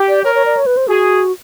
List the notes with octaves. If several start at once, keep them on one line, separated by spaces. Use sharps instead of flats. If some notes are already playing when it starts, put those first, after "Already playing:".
Already playing: G4
D5
A#4 C#5
C#5
D5
C#5
B4
C5
F#4 G#4